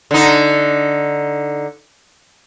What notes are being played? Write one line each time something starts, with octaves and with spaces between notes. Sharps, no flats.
D3 D#4